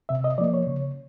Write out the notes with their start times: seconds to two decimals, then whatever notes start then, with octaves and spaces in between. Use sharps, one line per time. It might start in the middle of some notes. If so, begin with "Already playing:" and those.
0.09 C3 E5
0.24 D#5
0.38 F3 A#3 D5
0.54 C#5
0.67 C#3